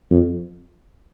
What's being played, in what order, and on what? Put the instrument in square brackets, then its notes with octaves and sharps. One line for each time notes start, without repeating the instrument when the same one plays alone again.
[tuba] F2